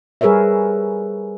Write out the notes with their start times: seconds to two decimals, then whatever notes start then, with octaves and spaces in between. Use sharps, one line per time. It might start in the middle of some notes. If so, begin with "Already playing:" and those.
0.21 G3 G#4 A#4 B4 C#5 E5